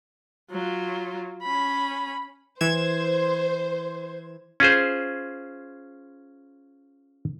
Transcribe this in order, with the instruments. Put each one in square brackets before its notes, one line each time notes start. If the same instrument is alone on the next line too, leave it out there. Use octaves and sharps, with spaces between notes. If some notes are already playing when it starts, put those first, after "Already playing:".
[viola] F#3 F4
C#4 B5
[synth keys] E3 G#6 E7 [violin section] C5
[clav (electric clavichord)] C#4 F4 G#4 C5